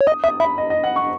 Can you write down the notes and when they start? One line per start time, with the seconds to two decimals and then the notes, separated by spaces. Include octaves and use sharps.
0.01 C#5
0.07 D#5 D#6
0.24 E5 D#6
0.40 E5 B5
0.58 D#5
0.70 D#5
0.84 F#5
0.96 C#6